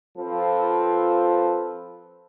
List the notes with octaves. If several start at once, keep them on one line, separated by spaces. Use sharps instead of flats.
F3 C4 F4 A4 B4